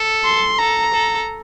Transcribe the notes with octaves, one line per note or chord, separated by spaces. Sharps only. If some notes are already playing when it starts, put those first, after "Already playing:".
Already playing: A4
C6
A4 A#5
A4